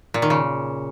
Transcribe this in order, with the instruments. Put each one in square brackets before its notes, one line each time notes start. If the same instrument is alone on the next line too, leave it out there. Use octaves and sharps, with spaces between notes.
[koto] A#2
D#3
C#3